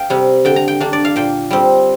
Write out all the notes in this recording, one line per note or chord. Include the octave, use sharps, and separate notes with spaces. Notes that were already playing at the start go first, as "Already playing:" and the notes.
Already playing: F5 G5
C3 G3
D3 G5
A#5
G5
A#3 D4
D5
F5
A#2 G5
G3 C4